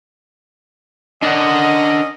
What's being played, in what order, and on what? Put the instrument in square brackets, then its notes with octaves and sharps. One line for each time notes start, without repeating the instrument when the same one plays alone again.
[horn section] C#4 A#4 D#5 [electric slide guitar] D4 D5 F#5